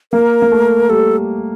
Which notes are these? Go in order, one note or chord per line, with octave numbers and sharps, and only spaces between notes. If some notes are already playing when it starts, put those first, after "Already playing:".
A#3 A#4
A#3
A3
G3 A4